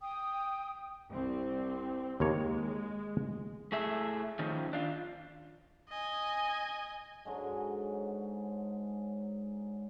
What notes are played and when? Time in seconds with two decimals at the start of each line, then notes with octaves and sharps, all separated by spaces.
0.01 G5 D#6
1.09 C2 C4
2.20 D#2 G#3 A#3 C#5
3.72 A2 A3 G#4 E5
4.39 D#3 F3 C#4
4.73 D4 F4
5.89 D#5 G#5
7.25 G#2 D3 F#3 G#3